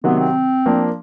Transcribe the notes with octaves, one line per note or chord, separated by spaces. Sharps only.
C3 D#3 F#3 B3
C4
F3 A#3 D4